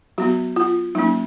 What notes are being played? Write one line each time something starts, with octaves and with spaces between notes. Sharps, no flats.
F#3 B3 F#4
F4
F#3 A#3 C#4 D#4